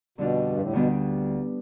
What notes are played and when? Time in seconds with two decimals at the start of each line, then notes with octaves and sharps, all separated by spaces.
0.18 F2 B2 D3 G3 D4 F4
0.49 G2
0.61 A2
0.73 D2 B2 D3 G3 B3 D4